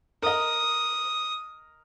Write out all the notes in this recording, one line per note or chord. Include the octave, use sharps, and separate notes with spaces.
A#4 D#5 D#6